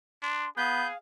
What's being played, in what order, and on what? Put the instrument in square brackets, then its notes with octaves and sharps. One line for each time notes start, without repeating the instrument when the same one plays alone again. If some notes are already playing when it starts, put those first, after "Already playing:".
[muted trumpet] D4 [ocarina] C6
[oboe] B3 [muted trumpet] G#4 [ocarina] F5 [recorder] G6